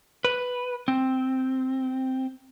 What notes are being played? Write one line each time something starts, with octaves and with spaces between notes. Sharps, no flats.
B4
C4